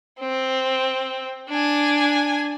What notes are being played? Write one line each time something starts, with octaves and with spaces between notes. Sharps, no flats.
C4
D4 G#5